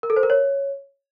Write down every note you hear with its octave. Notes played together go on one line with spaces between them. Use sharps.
A#4
A4
C5
A#4
C#5